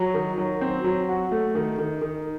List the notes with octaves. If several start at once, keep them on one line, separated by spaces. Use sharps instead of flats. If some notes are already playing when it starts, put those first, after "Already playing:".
Already playing: F#3
D#3
F#3
C4
F#3
F#4
A3
D#3
D#3
D#3